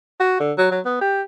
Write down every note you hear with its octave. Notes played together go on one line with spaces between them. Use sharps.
F#4
D3
F#3
F#3
B3
G4